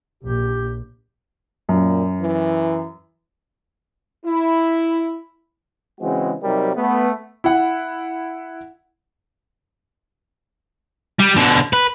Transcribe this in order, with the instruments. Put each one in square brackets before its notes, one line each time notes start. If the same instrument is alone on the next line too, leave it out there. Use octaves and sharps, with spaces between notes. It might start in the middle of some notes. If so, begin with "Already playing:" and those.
[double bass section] A#1 [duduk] G4
[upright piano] F#2 [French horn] A#2
[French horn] E3
[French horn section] E4
[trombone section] C#3 E3 G#3 C4 F#4
C3 F#3 G3 D#4 A#4
A3 B3
[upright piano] E4 F#5
[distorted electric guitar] G3
B2 D3
B4